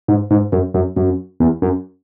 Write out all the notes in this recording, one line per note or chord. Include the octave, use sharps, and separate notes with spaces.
G#2
G#2
F#2
F#2
F#2
E2
F#2